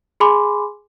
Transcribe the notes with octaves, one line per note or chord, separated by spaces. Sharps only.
G#4 G#5 B5 C6 D6